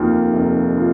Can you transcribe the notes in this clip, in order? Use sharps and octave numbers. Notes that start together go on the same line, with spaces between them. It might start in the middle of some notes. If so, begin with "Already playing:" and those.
Already playing: F1 D#2 D#3 A#3 F4
F1
F4